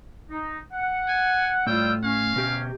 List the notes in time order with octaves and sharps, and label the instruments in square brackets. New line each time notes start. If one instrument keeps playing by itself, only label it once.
[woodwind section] D#4
F#5
[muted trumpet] G#5
[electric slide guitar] A2 [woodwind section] G3 F4 E6 [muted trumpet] G5
[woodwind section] C#4 [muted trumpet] F5
[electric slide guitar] B2 G4